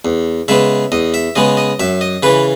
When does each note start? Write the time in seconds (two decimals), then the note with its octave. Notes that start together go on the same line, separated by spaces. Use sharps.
0.05 E2
0.48 C#3 G#3 B3 E5
0.92 E2 D#5
1.14 E5
1.36 C#3 G#3 B3 D#5
1.57 D#5
1.80 F#2 E5
2.01 D#5
2.23 C#3 E3 B4